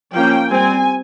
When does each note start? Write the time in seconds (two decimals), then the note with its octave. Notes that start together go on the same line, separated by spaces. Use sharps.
0.14 F3 A#3 C#4 G5
0.50 G3 C4 G#5